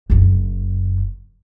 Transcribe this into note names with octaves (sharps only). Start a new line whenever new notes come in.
F#1 F#2